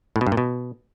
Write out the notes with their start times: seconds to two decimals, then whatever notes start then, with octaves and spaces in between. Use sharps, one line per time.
0.16 A2
0.21 B2
0.27 G2
0.32 A#2
0.37 B2